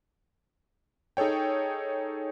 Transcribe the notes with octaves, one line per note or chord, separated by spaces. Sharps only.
D#4 G#4 A4 C#5 G5